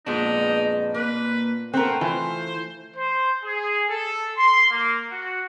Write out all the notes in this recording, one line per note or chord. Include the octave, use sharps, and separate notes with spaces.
F2 A#2 G#3 B3 D4 D#4
A#3 B4
A3 C4 A#4 B4 F#5
E3 F4 C5
C5
G#4
A4
C6
A#3
F#4